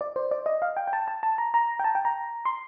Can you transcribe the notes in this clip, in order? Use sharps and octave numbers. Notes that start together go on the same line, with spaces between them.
D5
C5
D5
D#5
F5
G5
G5
A5
A5
A5
A#5
A#5
G5
A5
G5
A#5
C6